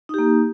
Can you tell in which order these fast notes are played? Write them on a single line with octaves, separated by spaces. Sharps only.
D#4 G4 A#3